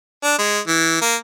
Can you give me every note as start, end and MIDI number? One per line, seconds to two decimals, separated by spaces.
0.23 0.35 62
0.38 0.59 56
0.67 1.01 52
1.02 1.15 58